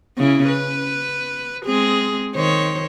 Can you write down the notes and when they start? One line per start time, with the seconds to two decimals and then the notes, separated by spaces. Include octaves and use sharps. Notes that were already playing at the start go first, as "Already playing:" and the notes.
0.18 C#3 C#4 E4
0.48 B4
1.65 G#3 C4 G#4
2.35 D#3 C5 C#5